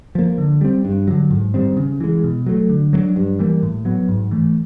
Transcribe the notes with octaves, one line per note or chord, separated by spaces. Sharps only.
F3 A#3
D3
G3 C4
G2
D3 F#3
G#2
D#3 G3 C4
C#3
E3 G#3
B2
F#3 A3
D3
F#3 A3 D4
G2
E3 G3 A#3
A2
F#3 B3
G#2
E3 A3